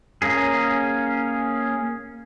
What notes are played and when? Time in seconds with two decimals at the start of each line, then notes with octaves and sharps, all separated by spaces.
0.22 A#3 C#4 G#4